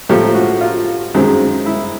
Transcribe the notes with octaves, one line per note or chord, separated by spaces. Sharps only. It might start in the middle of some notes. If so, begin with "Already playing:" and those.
A2 F3 A#3 G4
F#4
F4
F#2 D#3 G#3 C4
E4